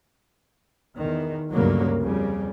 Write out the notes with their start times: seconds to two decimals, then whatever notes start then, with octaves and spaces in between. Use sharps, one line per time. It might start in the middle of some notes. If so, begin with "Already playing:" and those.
0.99 E2 D#3
1.52 D2 G2 C#3 F#3 A#3 B3
2.01 F2 C#3 G3